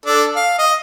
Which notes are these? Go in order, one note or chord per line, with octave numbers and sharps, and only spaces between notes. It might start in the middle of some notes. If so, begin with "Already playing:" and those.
D4 A4
F5
D#5